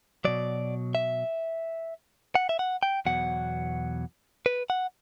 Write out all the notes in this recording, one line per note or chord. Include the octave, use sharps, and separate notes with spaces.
B2 F#3 D5
E5
F#5
E5
F#5
G5
E2 B2 F#3 F#5
B4
F#5